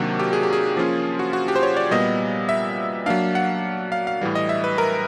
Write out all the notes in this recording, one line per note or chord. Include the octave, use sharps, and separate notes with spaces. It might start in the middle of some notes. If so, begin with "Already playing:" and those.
Already playing: C3 D#3 F#3 A#3 D4 F#4
G4
G#4
G4
G#4
F3 A#3 C#4 F4
F#4
F#4
G4
C5
C#5
D5
A#2 G3 B3 D#5
E5
F#3 A#3 D4 F5
F#5
F5
F5
A2 E3 G3
D#5
E5
B4
A#4